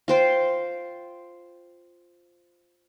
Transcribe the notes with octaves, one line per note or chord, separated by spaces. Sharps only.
F4 C5 G5